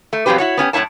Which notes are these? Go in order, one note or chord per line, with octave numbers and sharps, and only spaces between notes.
A3
F2 B2 F#3 C4 G4 B4
E4 F#4 C#5
B3 C#4 F#4 G4
F#2 A2 C4 E4 C#5 A5